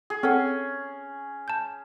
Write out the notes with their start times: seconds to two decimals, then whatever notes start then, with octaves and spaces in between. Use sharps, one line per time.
0.10 G#4
0.23 C4 C#4 A4 F#5
1.48 A5 G6